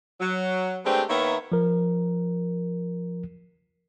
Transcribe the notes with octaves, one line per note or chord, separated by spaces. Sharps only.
F#3
G#3 A3 B3 C4 D4 G4
D#3 A#3 B3 C#5 E5
F3 A#4